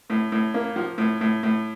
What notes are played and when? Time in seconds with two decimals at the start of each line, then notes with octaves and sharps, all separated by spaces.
0.10 A2
0.32 A2
0.54 A#3
0.76 F3
0.98 A2
1.21 A2
1.43 A2